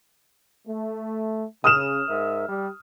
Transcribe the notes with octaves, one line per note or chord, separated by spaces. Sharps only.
A3
C#3 D#6 F6 E7
G#2 A#4 E5
G3